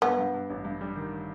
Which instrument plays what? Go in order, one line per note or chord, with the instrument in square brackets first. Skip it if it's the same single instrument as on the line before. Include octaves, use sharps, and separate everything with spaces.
[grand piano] G2 [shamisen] B3
[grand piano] G2
G2
A1
G2
G3
D#3